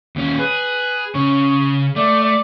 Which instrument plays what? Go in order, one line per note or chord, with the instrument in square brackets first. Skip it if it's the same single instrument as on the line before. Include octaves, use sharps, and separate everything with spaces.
[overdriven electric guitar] D#2 C#4
[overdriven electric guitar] G#4 [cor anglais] B4
[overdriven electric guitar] C#3 C#4 [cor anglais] C#5
[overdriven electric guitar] A3 [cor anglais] D5
[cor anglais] D5